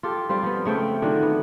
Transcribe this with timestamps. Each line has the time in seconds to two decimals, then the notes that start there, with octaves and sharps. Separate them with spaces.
0.03 F4 G4 A4
0.29 G3 C4 F4
0.43 F3 B3
0.65 C#3 A3 C4 G5
1.02 D3 D#3 F3 F#3
1.23 B3